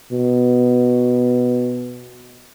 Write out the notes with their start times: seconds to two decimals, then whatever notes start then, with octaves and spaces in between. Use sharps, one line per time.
0.12 B2